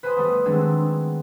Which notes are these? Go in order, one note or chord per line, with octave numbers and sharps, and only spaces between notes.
B4 C5 G#5 B5 C6 D#6
G3 A3 B3
D#3 F#3 G#3 C4 D4